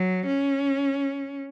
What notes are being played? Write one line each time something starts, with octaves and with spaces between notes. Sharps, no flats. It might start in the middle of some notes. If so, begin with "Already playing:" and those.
Already playing: F#3
C#4